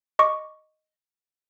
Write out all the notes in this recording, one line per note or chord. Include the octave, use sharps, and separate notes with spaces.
D#5 C#6 D6